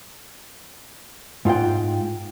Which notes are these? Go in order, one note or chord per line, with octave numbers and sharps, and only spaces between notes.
G#2 F4 F#5 G5